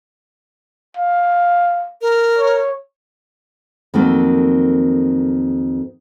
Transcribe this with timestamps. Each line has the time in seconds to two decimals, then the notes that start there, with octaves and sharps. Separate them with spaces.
0.97 F5
2.01 A#4
2.39 C#5
3.94 F2 D#3 F#3 A3 A#3 C4